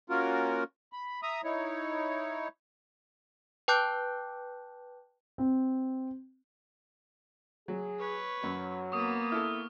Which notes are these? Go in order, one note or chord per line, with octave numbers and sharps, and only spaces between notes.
A#3 C#4 F4 F#4 A#4
B5
E5 A#5 D#6
D#4 E4 C#5
B4 G5 A5 D6 F#6 G6
C4
F#3 G#4
B4 C#5
F#2 F#3
A#3 B3 C#6 D#6
E4 A4 F6